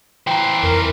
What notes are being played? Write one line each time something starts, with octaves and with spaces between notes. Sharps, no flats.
E3 C5 G5 A#5
F2 A#4